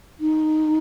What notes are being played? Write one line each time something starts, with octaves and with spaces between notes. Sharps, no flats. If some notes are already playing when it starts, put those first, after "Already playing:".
D#4